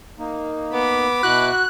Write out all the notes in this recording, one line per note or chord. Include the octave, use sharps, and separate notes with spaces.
A#3 D#4
B3 B5 D6
B2 E4 F#4 F#6